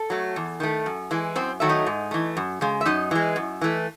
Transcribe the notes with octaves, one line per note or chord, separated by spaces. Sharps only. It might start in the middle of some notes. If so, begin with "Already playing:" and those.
Already playing: A4
F#3 A3
E2
D#3 A3
F#2
E3 G#3
F#2 C4 C5
D#3 F#3 A3 E5
D#4 D#5
G#2
E3 A3
F#2
C#3 G#3
E5
F#2 D#4 D#5
E3 G#3
F#2
E3 A3